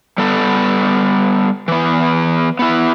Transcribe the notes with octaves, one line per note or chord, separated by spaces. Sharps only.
G3 B3 A4
E3 B3
B3 E4